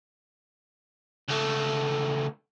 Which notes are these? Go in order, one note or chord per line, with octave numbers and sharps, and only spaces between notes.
C#2 A3